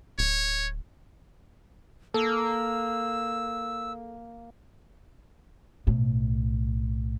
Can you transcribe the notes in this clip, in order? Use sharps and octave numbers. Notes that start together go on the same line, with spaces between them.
D1 C#5
A#3 A4 E6
B1 A2